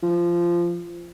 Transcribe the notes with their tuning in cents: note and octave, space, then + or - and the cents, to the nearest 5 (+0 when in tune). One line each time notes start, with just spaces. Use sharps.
F3 -15